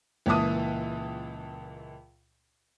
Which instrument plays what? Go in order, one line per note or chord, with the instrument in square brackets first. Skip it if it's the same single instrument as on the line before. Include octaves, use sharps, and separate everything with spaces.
[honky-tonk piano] C#2 A#2 E3 E5 A5 D#6